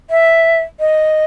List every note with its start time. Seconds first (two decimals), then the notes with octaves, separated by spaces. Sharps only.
0.10 E5
0.80 D#5